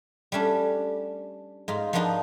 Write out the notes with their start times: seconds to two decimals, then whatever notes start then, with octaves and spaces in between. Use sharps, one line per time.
0.32 G3 A3 C#4 D4
1.68 G#2 D#4 F4
1.93 F3 A#3 B3 D4 D#4